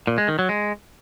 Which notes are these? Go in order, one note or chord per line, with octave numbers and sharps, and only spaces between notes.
A#2
G#3
D#3
F#3
G#3